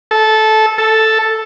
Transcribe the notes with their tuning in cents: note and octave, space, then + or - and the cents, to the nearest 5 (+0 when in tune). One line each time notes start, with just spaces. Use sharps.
A4 -15
A4 +0